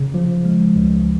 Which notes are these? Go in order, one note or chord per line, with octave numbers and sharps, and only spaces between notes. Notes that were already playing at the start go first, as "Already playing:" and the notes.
Already playing: C#3
F3
G#3
C#2